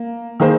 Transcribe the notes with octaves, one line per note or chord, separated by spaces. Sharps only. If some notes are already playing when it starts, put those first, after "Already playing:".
Already playing: A#3
D#3 A#3 G#4 C5